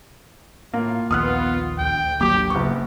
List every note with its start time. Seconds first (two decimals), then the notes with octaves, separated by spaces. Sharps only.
0.74 A2 A#3 F4
1.11 A#1 D#2 B3 F4 D#6 F6 F#6
1.79 D2 G5
2.21 G#1 F#3 A#3 G4 D6
2.50 F#1 B3 C#6